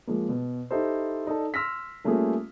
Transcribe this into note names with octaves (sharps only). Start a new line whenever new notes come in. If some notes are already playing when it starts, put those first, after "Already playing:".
F3 G#3 A#3
B2
D#4 E4 G4 A4 C5
D#4 A4 D5 A5
C6 E6 F6 A#6 B6
G3 A3 A#3 C#4 F4 G#4